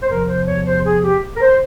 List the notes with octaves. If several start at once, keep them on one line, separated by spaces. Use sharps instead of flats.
C5
E2 C3 F3 A#4
C5
C#5
C5
G#4
G4
A#4
C5